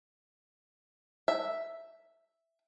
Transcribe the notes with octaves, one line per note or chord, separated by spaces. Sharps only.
E5